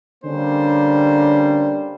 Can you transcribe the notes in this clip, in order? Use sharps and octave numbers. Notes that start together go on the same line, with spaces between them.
D3 G3 A#3 C#4 D4 C5